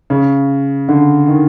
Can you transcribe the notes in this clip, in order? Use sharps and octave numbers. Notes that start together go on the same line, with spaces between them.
C#3
D3
D#3